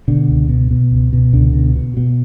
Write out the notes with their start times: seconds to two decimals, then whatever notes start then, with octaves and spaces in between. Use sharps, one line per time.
0.08 B2 D3
0.28 C#2
0.49 B2
0.71 B2
0.91 C#2
1.13 B2
1.33 C#2 D3
1.54 B2
1.75 B2
1.97 B2